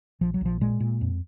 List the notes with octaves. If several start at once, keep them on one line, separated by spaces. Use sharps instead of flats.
A#1 F3
F#3
A#1 F3
A#2 G#3
A#2
F2